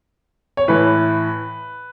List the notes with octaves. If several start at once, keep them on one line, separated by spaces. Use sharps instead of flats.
C#5
A2 E3 B4